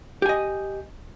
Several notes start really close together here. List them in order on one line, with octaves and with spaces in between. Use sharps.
G4 G#5 D#5